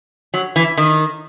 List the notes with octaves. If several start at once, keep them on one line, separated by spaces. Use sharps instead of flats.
F#3
E3
D#3